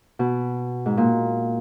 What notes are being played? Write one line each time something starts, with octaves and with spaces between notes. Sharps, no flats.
B2
G#2
A#2